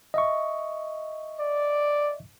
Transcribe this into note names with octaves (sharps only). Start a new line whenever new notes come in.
D#5 E5 C#6
D5